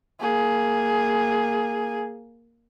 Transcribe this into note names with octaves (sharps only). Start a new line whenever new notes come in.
A#3 G#4